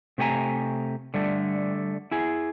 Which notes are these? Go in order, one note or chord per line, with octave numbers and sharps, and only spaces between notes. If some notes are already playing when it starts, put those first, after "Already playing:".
C3 A3 G4 D5 G#5 A#5
D3 G3 A3
E4 G#4